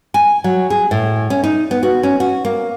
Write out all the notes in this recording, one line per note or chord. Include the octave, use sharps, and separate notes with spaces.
G#5
F#3
G#4
A2
C#4
D#4
B3
F#4
C#4
F#4
A#3